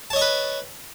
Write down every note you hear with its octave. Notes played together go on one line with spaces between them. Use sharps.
B4 C#5 D#5 A5 C#6